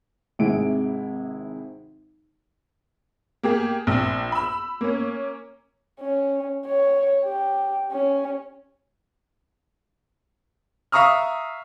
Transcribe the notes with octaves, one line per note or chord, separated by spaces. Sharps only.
G#1 C3 G#3 E4 D7
A#3 G4 G#4
A#1 C4 E6
B5 E6
A#3 C#4
C#4
C#5
G4
C#4
E5 F5 A#5 C#6 D#6 F6